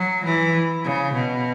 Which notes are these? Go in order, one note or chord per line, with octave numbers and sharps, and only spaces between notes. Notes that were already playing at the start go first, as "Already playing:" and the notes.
Already playing: F#3
E3
C#3
B2